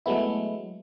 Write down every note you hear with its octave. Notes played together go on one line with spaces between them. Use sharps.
F#3 G#3 A3 B3 E4